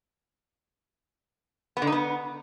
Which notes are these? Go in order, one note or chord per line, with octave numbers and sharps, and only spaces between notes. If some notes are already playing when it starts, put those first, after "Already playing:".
B3
D3
D#4
B3